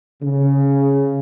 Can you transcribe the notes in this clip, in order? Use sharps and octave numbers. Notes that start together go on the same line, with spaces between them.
C#3